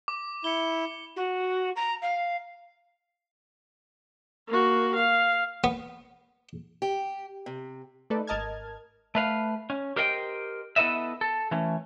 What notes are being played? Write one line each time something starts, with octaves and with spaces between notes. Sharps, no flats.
D6
E4 C#7 G7
F#4
A#5
F5
A#3 F#4
F5
B3
G4
C3
A3 D#4 A4 B4 D5
G#1 A#4 D#5 A5 F6 G#6
A3 B4 F5
C#4
G4 A#4 C5 D#5 F5 G5
B3 E4 A4 B4 D#5 E5
A4
E3 A3 C#4